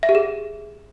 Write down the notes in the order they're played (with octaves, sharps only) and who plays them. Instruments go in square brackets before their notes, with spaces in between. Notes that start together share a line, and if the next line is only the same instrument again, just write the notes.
[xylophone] E5
G4
G#4